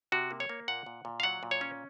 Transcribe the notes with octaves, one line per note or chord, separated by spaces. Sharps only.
C3 F#4
A#3
C#5
A#3
A#2 F#5
A#2
A#2
F5
F#3 F#5
A#2
C#5
C#4